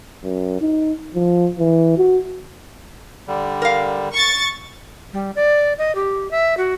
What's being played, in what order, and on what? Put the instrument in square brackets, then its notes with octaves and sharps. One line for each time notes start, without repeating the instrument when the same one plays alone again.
[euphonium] F#2
D#4
F3
E3
F#4
[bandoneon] D3 G3
[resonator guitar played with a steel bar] A#4 F5
[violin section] C#6 A6
[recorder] G3
D5
D#5
G4
E5
F#4